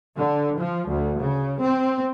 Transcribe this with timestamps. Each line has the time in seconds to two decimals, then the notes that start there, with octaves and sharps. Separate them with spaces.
0.18 D3
0.57 F3
0.90 D2
1.21 C#3
1.61 C4